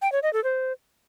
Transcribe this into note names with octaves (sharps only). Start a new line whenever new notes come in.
G5
C#5
D#5
A4
C5